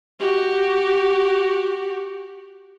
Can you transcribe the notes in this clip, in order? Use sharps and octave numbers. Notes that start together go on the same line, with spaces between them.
F#4 G4